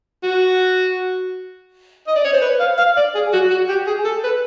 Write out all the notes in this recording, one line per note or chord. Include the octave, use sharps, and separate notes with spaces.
F#4
D#5
D5
C#5
C5
B4
F5
F5
D5
G#4
F#4
F#4
G4
G#4
A4
B4